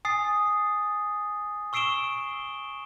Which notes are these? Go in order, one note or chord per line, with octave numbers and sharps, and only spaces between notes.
G#5 D#6 A6 C7
C#6 E6 C7 D7 E7 G7